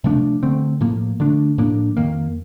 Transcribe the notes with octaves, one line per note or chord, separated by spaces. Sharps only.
C3 F3 A3 D4
D3 A3 C4
A2 F3 A#3
D3 A3 D4
A2 F3 A#3 D4
F2 D#3 A#3